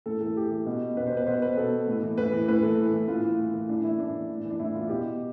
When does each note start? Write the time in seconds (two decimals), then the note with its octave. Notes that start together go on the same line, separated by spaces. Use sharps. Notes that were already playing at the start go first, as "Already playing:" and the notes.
0.06 A2 A4
0.21 E3 A4
0.36 A2 G4
0.51 E3
0.66 B2
0.97 B2 B4
1.07 C5
1.17 B4
1.27 B2 C5
1.42 B4
1.57 B2 A4
1.87 A2
2.02 E3
2.18 A2 B4
2.32 E3
2.48 A2 B4
2.63 E3 A4
2.78 A2
2.93 E3
3.08 A2 F4
3.23 E3
3.38 A2
3.54 E3
3.69 A2 D4
3.84 E3 E4
3.99 A2 D4
4.14 E3
4.29 A2
4.44 E3
4.50 D4
4.59 A2 E4
4.74 E3 F4
4.89 B2 G4